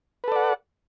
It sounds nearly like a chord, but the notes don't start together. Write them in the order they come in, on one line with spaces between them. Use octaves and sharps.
B4 A4 D5 F#5